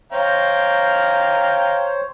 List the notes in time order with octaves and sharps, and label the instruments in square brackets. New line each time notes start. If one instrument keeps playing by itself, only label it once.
[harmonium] C5 C#5 [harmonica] F5 G5 A#5